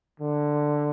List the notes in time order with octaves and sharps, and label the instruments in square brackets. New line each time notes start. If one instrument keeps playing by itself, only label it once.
[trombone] D3